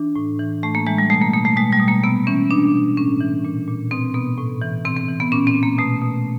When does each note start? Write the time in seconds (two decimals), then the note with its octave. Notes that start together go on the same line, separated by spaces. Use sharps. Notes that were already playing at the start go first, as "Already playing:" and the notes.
Already playing: E3 D4
0.16 A2
0.40 E3
0.63 A2 A3
0.75 A#3
0.87 E3 G#3
0.98 G3
1.10 B2 A3
1.22 A#3
1.33 B2 A#3
1.45 A3
1.57 B2 G#3
1.72 G3
1.80 B2
1.88 A#3
2.04 C3 B3
2.27 E3 C#4
2.50 B2 D4
2.74 B2
2.97 A2 C#4
3.21 E3
3.45 A#2
3.68 A#2
3.91 B2 C4
4.14 B2 B3
4.38 A2
4.62 E3
4.85 C3 C4
4.97 C4
5.08 E3
5.20 B3
5.32 A#2 C#4
5.47 C4
5.55 A#2
5.63 A#3
5.78 B2 A3
6.02 B2